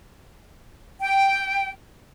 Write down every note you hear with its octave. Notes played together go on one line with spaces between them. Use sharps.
G5